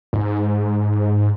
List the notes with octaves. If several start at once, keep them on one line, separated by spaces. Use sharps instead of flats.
G#2